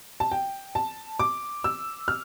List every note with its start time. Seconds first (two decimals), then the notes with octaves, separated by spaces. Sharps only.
0.20 A5
0.32 G5
0.75 A5
1.19 D6
1.64 E6
2.08 F6